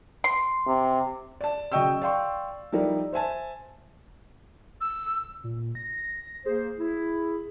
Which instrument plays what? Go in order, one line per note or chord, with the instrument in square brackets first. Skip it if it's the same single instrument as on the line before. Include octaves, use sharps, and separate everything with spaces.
[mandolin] C6
[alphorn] C3
[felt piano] D5 A5
C#3 F#3 D#5 G5 C#6 E6
D5 F5 G5 C6 C#6
F3 G3 D#4 E4 A#4 D5
C5 E5 G#5 A5
[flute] E6
[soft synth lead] A#2
A#6
[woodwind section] A#3 C5 [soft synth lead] G#4
[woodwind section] E4